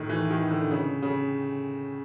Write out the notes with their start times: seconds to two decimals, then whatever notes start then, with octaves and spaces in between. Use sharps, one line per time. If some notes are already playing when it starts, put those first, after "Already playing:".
Already playing: A2 D#3
0.09 E3
0.31 D#3
0.50 D3
0.71 C#3
1.02 C#3